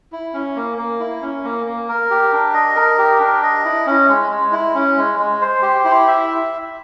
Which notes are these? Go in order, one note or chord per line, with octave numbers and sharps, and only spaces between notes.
E4
C#4
A#3
A#3
E4
C#4
A#3
A#3
A#4
G4
D4
D#5
A#4
G4
D4
D#5
E4
C#4
G#3
G#3
E4
C#4
G#3
G#3
C5
G4
E4
E5